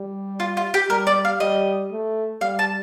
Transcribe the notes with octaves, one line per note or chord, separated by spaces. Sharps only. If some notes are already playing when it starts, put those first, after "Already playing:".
Already playing: G3
F4
F4
G4
G3 A#4
D5
F5
G3 D#5
A3
G3 F5
A5